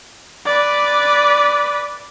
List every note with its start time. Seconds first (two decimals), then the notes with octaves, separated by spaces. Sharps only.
0.46 B4 D5